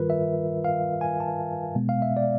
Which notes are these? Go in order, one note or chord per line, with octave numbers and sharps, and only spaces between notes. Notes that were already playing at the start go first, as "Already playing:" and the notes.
Already playing: G2 D#3 G3 F4 A#4 B4
E5
F5
G#5
A5
B2 G#3 B3
F5
E5
D5